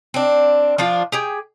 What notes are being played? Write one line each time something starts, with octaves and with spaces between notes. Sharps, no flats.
C4 D4
F3 D4 F4
G4 G#4 G5